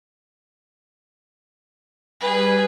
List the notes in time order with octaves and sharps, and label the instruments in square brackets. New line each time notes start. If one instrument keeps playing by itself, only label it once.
[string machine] G3 [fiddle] G#4 B4